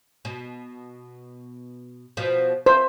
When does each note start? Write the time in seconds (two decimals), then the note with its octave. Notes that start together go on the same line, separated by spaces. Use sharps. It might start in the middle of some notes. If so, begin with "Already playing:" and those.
0.25 B2
2.17 B2 F3
2.66 C5 E5